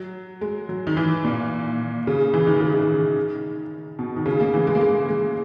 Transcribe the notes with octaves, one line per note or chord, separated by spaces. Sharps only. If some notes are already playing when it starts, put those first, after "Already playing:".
Already playing: F#3
G#3
F#3
D#3
E3
A#2
C#3
E3
D#3
C#3
D#3
B2
D#3
C#3
A#3
E3
G#3
A#3
G#3
G#3